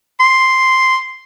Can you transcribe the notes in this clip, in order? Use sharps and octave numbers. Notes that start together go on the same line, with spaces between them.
C6